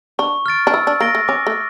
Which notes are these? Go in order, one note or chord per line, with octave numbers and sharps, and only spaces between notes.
D4 C#6
F6 A6 D7
D4
E4 E6
D4
A#3 A#6 D7 G7
A3
C#4 D6
A3